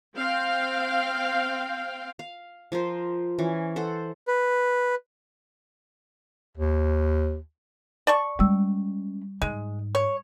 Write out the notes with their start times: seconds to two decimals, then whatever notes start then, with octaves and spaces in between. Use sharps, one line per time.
0.16 C4 F5 G5
2.19 F5
2.72 F3 F4 A#4 C5
3.39 E3 C#4
3.76 A4 C5 F#5
4.28 B4
6.57 D#2
8.07 D5 A5 C#6
8.39 G3 G#3 C#4 E6
9.42 G#2 G#3
9.95 C#5